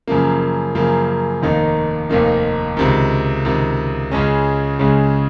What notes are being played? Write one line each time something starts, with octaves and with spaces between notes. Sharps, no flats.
F#2 C#3 F3 A#3
F#2 C#3 F3 A#3
F1 D#2 D#3 A#3 D#4
F1 D#2 D#3 A#3 D#4
C#2 C3 D#3
C#2 C3 D#3
C#2 C#3 G#3 C#4
C#2 C#3 G#3 C#4